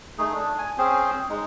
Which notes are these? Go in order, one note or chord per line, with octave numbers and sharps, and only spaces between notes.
A3 D#4 G#4
D4
G#5
C4 C#4 G#4 C5
G#3 D#4